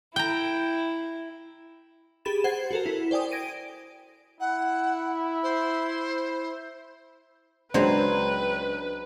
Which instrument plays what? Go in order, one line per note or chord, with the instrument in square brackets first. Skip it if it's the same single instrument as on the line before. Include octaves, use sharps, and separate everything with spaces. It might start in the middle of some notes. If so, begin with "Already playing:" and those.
[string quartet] E4 [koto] G5 A#5
[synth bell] G4 G#4 B5 A6 E7
C5 F#5 G#6 C7
F#4 A4 A#4
E4
C5 D5 G5 G#5 D#6
G#6 A#6 D7 D#7
[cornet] E4 [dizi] F#5
[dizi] C5
[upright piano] C#2 [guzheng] F#3 C5 [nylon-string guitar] D4 [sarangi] B4